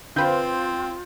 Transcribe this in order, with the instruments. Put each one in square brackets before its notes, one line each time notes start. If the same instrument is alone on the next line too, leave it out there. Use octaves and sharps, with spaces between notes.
[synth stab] D3 B4 C5 [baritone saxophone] C4 [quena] F4 [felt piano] F5 G5 G6